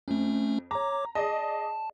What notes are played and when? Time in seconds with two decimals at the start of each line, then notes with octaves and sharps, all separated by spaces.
0.08 F2 A3 C#4
0.71 C#5 A#5 D6
1.15 G#4 D5 D#5 A5